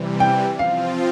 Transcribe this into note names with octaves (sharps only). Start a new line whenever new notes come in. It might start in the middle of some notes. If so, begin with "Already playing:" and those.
Already playing: C3 E3 G3
G5
F3 C4 F4 F5